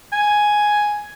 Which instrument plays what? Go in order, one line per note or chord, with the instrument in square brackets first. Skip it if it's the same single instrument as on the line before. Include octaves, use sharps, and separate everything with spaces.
[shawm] G#5